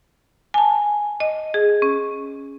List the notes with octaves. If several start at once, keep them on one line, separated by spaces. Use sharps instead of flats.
G#5 A5
D#5
G#4
C#4